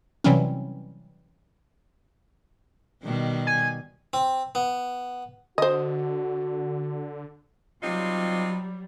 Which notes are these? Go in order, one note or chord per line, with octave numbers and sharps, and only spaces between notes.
C3 E3 F#3 G3 C4 C#4
B2 D#3 G3
G#5
C4
B3
D3 F#4 C5 D#5
C3 F#3 G3 D#4 F4